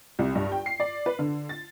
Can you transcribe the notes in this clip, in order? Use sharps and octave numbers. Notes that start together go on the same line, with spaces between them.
C2
G2
G5
C7
D5
B4
D3
A6